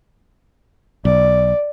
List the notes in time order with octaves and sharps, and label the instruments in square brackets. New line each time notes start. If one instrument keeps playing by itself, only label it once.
[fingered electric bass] B1 [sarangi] D5